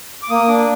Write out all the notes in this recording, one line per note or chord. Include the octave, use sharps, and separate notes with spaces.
D6
A#3 D#6
D4 D6